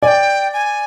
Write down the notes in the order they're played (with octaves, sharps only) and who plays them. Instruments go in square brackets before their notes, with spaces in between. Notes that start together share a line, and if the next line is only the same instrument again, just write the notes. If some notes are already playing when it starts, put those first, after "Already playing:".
[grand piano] D5 [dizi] G5 G#5
[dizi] G#5